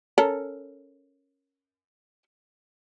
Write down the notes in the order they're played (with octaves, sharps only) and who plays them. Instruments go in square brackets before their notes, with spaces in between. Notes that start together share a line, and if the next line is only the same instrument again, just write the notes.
[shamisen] C#4 A4 A#4